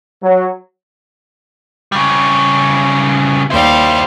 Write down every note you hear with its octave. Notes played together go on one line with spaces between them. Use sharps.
F#3
C#3 G3
D#2 G3 E4 C5 F5